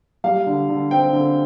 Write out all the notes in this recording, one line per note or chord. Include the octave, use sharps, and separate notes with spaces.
G3 F5
D3
D3
C4 G5
D3